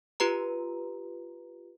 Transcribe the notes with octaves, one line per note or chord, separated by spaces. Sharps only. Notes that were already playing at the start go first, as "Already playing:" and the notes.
F4 G4 B4 A#5